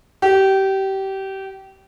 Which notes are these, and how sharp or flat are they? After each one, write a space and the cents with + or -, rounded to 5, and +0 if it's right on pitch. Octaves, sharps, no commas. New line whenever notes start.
G4 -25